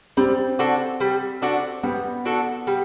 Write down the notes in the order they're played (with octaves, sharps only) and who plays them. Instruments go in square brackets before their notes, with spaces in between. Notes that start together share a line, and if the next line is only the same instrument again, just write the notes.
[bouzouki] G3 [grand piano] C4
[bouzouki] D4 F#4 A4
G3
D4 F#4 A4
[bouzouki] G3 [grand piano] B3
[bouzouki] D4 F#4 A4
G3